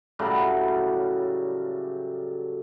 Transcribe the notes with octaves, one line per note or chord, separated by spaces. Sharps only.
A2 C#3 F#3 G3